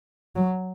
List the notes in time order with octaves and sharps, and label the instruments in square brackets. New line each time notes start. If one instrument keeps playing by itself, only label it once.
[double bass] F#3